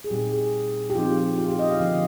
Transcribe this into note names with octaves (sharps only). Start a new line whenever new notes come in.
G#4
A#2 G3 C4 D#4 G4
G#4
G4
F3 C4 D#4 F4
G4
F4
G4
D#5
F5
D3 F3 A#3 D4